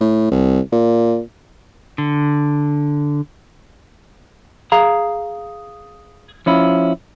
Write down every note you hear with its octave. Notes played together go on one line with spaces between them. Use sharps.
A2
C2
A#2
D3
G#4 F5 A#5
F3 C#4 E4 F4